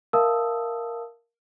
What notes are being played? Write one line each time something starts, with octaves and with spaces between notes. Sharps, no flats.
A#4 E5 F5 A5 D#6 E6